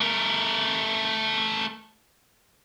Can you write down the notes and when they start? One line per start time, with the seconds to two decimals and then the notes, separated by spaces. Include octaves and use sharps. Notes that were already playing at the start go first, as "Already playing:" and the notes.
0.01 A3 A#4